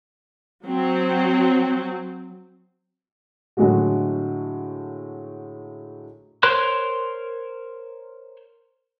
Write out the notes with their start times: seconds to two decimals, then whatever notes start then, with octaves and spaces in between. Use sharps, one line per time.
0.65 F#3 C4
3.57 A2 D3 F#3 G#3 A3 F#4
6.43 A#4 C5 C#5 C6 F#6